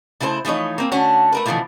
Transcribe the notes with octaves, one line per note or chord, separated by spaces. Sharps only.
C#3 A3 E4 A4 C5
E3 F3 A3 D#4 C#5
A#3 C4
D3 A3 C#4 D4 F#4 C#5
A3 A#4 B4
B2 D3 E3 F3 A3 A#3